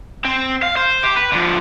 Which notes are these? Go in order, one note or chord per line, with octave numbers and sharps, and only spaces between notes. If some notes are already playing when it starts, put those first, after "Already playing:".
C4
F5
C5
G4
B4
D3 F3